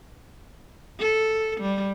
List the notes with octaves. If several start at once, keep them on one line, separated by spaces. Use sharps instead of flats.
A4
G3